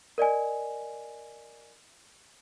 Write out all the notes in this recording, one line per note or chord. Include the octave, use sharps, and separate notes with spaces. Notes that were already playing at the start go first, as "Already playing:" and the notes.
A#4 D5 D#5 G#5